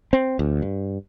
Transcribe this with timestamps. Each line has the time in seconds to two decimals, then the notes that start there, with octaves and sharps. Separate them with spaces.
0.13 C4
0.39 D2
0.62 G2